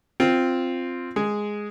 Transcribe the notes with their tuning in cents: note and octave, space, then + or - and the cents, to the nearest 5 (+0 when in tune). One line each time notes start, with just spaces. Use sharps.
C4 +0 F4 +0
G#3 +0 G#4 +0